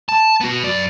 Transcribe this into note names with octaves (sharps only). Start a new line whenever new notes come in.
A5
B3 F#4
F#2 D5